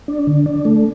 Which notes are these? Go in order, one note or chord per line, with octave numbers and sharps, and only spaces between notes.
D4
D3
D4
A3